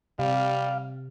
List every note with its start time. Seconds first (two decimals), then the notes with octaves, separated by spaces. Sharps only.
0.19 C3 G3 F5